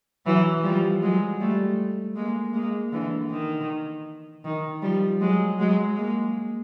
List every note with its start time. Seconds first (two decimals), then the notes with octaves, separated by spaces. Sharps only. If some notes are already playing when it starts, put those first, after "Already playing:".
0.25 E3 F#3
0.63 F3 G3
1.02 F#3 G#3
1.40 G3 A3
2.16 G#3 A#3
2.53 G#3 A#3
2.92 D3 E3
3.30 D#3
4.44 D#3
4.82 F3 G3
5.21 F#3 G#3
5.59 F#3 G#3
5.97 G#3 A#3